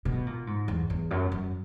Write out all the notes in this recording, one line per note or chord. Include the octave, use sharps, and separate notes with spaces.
B2
A#2
G#2
E2
E2
F#2
F#2